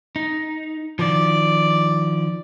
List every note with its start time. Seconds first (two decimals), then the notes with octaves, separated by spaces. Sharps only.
0.16 D#4
0.99 D#3 F3 D5